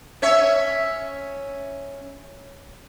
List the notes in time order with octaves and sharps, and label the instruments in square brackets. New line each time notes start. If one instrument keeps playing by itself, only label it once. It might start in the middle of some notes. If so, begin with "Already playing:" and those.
[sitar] C#4 C#5 E5